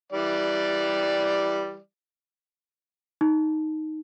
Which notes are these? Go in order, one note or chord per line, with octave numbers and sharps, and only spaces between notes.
E3 G3 D5
D#4